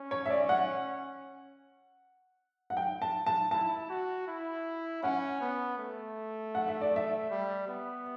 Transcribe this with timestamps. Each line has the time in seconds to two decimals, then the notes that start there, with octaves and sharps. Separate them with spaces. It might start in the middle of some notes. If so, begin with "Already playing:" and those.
Already playing: C#4
0.11 C#5
0.26 E5
0.30 D5
0.49 F#5
2.70 F#5
2.77 G5
3.02 A5
3.26 A5
3.51 E4 A5
3.90 F#4
4.27 E4
5.03 C#4 F#5
5.41 B3
5.79 A3
6.55 F#5
6.68 E5
6.81 D5
6.96 E5
7.30 G3
7.68 B3